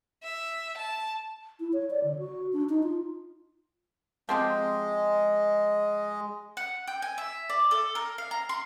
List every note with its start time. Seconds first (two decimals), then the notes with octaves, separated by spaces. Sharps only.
0.23 E5
0.78 A5
1.60 E4
1.73 C#5
1.90 D5
2.04 D3
2.19 F#4
2.53 D4
2.69 D#4
2.83 F4
4.29 F3 G#3 C4 G4 D#5
6.57 F#5
6.87 G5
7.02 G#5
7.18 E5
7.49 D5
7.71 A4
7.95 A#4
8.18 F5
8.31 A#5
8.49 C6